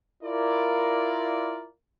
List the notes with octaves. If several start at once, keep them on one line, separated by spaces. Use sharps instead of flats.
E4 F4 A#4 D5